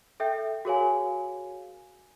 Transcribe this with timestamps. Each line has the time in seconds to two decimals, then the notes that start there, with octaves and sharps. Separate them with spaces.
0.20 A4 E5 G5 G6
0.65 F#4 G#4 A#4 C#5 F5 G#5